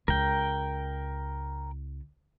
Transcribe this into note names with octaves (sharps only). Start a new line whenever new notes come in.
C#2 A#4 G5